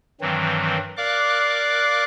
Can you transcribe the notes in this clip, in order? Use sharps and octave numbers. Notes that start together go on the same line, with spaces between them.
G2 D#3 E3 F#3 C4
A#4 D5 F5 D6 F#6